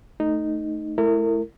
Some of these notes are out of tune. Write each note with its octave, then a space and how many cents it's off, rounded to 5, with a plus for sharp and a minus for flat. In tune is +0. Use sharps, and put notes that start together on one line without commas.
A3 +0 D#4 -5
A3 -35 E4 +5 A#4 -35